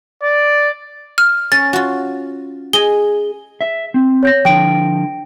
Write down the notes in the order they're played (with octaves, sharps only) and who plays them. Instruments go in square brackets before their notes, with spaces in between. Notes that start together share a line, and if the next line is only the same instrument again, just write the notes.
[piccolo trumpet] D5
[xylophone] F6
[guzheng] C#4 [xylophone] A6
[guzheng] F4 F#4
[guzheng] G#4 D#5 [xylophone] G7
[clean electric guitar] E5
C4
[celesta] C#5 G6 A#6
[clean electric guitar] D3 F3 [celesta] G5 D7